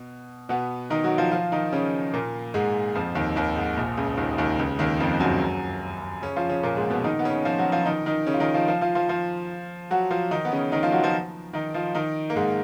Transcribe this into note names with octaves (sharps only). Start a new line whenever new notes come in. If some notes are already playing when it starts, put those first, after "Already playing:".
Already playing: B2
B2 B3
D#3 D#4
F#3 F#4
F3 F4
F3 F4
D#3 D#4
C#3 C#4
A#2 A#3
G#2 G#3
F2 F3
D#2 D#3
D#2 D#3
G#2
A#1 A#2
C#2 C#3
D#2 D#3
D#2 D#3
C#2 C#3
D#2 D#3
F2 F3
F#2 F#3
C#3 C#4
F3 F4
C#3 C#4
A#2 A#3
G#2 G#3
B2 B3
D#3 D#4
B3
C#3 C#4
F3 F4
F#3 F#4
F3 F4
D#3 D#4
D#3 D#4
C#3 C#4
F4
D#3 D#4
F3 F4
F3 F4
F3 F4
F3 F4
F3 F4
F#3 F#4
F3 F4
D#3 D#4
B3
C#3 C#4
D#3 D#4
F3 F4
F#3 F#4
F3 F4
D#3 D#4
F3 F4
D#3 D#4
A#3
G#2 G#3